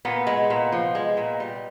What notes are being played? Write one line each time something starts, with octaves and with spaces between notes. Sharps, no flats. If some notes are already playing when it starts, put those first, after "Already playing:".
A#2 B3
G#3
A#2
F3
G#3
A#2
G3